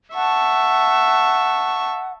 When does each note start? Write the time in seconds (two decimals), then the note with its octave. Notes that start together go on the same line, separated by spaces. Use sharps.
0.15 E5 F#5 A5 C#6